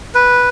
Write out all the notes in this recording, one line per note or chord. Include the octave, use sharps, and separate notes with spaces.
B4